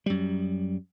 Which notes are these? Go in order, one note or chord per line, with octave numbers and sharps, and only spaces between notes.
F#2 G3